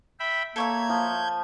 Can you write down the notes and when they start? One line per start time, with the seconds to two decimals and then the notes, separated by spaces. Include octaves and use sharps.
0.20 E5 G5 B5
0.56 A#3 A4 C#5 E5 G6 G#6
0.90 F3